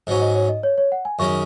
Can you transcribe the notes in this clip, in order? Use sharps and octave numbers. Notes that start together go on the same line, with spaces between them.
G#2 F#3 C#4
D#5
C#5
D#5
C#5
C#5
F#5
G#5
F#2 D#3 G#3 C#4 C#6